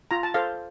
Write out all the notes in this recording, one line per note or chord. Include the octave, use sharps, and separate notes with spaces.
F4 A#5
A5
A4 C5 F5